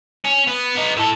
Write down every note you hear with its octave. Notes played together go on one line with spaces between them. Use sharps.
C#4
B3
B3 D#4
A2 A4